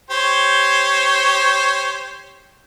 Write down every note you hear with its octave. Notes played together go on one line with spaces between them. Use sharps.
G4 C5 C#5